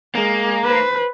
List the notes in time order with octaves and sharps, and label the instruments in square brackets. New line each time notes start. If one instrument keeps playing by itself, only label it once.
[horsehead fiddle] G#3 [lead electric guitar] A#3
[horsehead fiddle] B4 C5